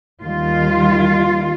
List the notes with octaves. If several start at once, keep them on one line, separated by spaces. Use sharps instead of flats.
D#2 D#3 G3 F4